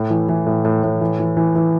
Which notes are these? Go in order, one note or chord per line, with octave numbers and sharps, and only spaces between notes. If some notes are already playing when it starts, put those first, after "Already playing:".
Already playing: A2
E3
E3
A2
A2
A2
E3
E3
E3
E3